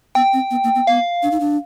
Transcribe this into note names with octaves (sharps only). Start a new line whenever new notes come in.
B3 G5
C4
B3
A#3
B3
B3 F5
D4
D#4
D4